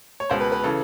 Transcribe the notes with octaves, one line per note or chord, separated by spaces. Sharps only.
C#5
C#2 B2 C5
B4
B4
C#3 E3 A4